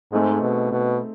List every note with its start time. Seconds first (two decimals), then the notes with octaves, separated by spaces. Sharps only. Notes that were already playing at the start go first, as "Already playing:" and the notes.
0.12 G#2 A3 C4 D#4 G#4
0.41 B2
0.72 B2